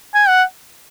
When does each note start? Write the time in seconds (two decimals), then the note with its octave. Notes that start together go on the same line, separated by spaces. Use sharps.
0.15 G#5
0.28 F#5